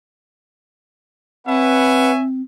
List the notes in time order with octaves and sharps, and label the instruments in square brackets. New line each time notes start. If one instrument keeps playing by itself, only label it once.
[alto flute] C4 [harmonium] B4 F#5 [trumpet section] C#5 E5 G#5